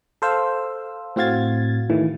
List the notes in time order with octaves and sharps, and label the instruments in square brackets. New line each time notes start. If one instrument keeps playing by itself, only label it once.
[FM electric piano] A4 C5 F5 E6
A2 C4 F#4 F5 G#6 A6
A2 D#3 E3